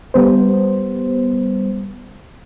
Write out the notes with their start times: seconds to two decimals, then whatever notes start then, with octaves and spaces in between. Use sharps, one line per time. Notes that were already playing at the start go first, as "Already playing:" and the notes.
0.14 G3 B3 C5